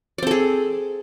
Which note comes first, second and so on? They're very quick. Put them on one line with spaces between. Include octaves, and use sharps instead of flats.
D5 C4 A4 G#4